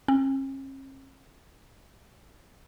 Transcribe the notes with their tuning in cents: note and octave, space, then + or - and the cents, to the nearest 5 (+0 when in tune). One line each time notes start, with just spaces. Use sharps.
C#4 -45